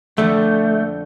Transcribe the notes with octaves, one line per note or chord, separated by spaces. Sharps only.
F2 D3 F3 A3